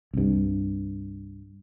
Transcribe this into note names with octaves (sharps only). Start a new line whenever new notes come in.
C2 G2